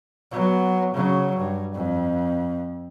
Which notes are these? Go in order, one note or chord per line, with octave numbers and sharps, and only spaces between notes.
F#3 B3
C#3 F#3
G2
F2